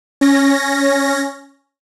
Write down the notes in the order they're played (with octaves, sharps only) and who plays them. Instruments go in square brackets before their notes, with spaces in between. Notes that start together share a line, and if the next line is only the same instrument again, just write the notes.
[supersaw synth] C#4 A#6